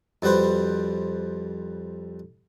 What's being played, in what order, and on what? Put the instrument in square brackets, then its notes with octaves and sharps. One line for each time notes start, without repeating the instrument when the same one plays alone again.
[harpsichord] F2 G3 F#4 B4 C5